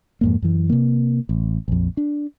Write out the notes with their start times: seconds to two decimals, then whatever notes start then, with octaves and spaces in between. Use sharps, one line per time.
0.21 F2 G#2 A#3
0.42 F#2 E3
0.69 C3 A#3
1.29 A1
1.68 A#1 F2
1.97 D4